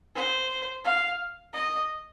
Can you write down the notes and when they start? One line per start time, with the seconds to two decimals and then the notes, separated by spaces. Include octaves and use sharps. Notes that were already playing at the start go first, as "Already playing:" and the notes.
0.15 C5
0.85 F5
1.54 D#5